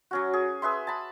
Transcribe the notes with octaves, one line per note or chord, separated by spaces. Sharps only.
F#3 C#4 F#4
G#4
G#4 B4 E5 C6
A5 B5